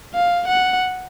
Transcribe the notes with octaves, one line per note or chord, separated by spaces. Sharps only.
F5
F#5